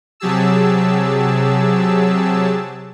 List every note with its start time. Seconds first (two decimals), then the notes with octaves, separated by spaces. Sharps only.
0.20 C3 F#3 G4 G#4 A5 E6